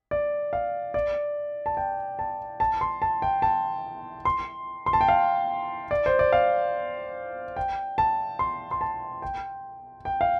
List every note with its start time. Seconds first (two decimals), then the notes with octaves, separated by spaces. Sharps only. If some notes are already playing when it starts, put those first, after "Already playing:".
0.11 D5
0.53 F5
0.94 D5
1.66 A5
1.77 G5
2.19 A5
2.60 A5
2.81 C6
3.02 A5
3.22 G5
3.42 A5
4.25 C6
4.86 C6
4.93 A5
5.01 G5
5.08 F5
5.91 D5
6.06 C5
6.19 D5
6.33 F5
7.56 G5
7.98 A5
8.39 C6
8.71 C6
8.81 A5
9.22 G5
10.05 G5
10.21 F5